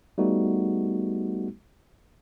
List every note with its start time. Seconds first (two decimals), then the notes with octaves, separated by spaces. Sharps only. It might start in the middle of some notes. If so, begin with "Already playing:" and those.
0.18 G3 A3 B3 D#4 F#4 G#4